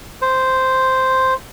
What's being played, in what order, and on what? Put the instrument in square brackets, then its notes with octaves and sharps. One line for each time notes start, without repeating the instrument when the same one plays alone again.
[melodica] C5